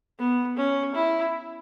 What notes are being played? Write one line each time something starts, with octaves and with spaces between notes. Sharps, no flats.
B3
C#4
E4